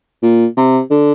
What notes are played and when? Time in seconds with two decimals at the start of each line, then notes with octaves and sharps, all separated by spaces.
0.23 A#2
0.57 C3
0.90 D3